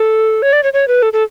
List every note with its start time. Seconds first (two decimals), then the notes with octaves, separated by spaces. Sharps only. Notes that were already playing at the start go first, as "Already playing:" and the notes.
Already playing: A4
0.42 C#5
0.53 D5
0.63 C#5
0.73 C#5
0.88 B4
1.02 A4
1.13 A4